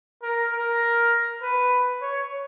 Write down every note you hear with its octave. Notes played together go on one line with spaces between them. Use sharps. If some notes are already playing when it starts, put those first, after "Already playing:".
A#4
A#4
B4
C#5